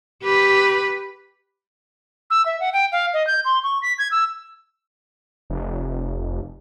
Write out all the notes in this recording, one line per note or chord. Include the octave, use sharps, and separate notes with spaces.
G4 B4
E6
E5
F#5
G5
F5
D#5
G6
C6
C#6
B6
G#6
E6
F1